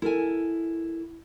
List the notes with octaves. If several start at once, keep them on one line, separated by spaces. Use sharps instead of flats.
E4 A4 A#4 G#5